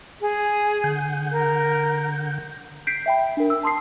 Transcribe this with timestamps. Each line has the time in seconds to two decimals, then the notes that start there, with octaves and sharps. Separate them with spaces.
0.21 G#4
0.84 D3 F#5 G6
1.32 A#4
2.87 G6 B6 C7 D7
3.06 E5 G5 B5
3.37 D4 A#4
3.50 E6
3.63 A5 C6 D#6 C7